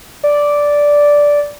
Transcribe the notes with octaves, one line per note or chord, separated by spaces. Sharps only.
D5